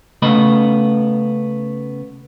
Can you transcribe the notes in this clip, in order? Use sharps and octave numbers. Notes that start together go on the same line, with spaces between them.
C#3 A3 B3 D#5 B5